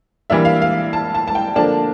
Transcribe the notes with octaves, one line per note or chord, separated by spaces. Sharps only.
E3 G3 A#3 D4 E5
F5
F5
A5
A5
A5
G5
D3 F3 A#3 D4 A5